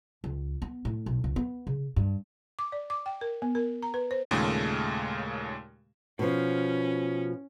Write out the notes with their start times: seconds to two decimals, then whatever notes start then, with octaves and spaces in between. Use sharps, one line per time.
0.24 C#2
0.62 B3
0.85 A2
1.06 B1
1.24 C#2
1.36 B3
1.67 C#3
1.96 G2
2.59 D6
2.72 D5
2.90 D6
3.06 G5
3.21 A#4
3.42 B3
3.55 A#4
3.83 A#5
3.94 B4
4.11 C5
4.31 D#2 A#2 C#3 G#3 A3
6.19 B2 F3 C#4